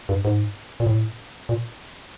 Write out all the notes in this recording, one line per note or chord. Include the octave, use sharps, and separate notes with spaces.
G2
G#2
A#2
A2
A#2